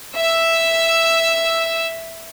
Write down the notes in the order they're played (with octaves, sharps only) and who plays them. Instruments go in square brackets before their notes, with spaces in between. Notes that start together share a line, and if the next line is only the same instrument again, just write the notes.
[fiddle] E5 E6